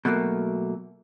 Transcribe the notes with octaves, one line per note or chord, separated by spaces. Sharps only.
B2 F#3 A3 A#3